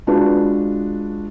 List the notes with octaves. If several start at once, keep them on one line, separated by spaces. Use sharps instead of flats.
G#3 D4 F4 F#4 B4